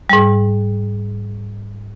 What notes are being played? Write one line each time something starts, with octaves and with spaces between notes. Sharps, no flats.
G#2 G3